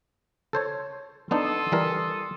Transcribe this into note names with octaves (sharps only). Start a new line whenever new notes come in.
A4 C5 C#5
B3 D4 D#4 A4 C6 D#6
E3 G3 A#4